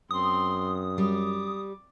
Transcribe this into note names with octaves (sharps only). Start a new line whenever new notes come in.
F#2 C4 C6 D#6
G3 D6